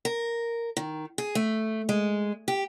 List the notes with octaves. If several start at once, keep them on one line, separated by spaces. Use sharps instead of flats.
A#4
D#3
G#4
A3
G#3
G4